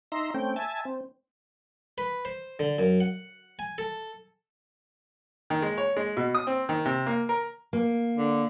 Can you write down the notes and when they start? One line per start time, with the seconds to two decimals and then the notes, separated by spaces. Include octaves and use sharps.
0.12 D#4 E5 A#5 C6
0.34 A3 C4 C#4 G5
0.56 E5 G#5 A5
0.85 C4
1.98 B4
2.25 C5
2.59 D3
2.78 F#2
3.00 F#5
3.59 G#5
3.78 A4
5.50 D#3
5.62 G#3
5.78 C#5
5.97 G#3
6.17 B2
6.35 D#6
6.47 C4
6.69 D#3
6.85 C3
7.06 A#3
7.29 A#4
7.73 A#3
8.17 D3